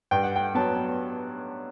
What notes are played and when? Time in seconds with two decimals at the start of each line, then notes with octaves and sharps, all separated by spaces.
0.11 G2 G5
0.23 F#5
0.36 G5
0.55 F#3 B3 A5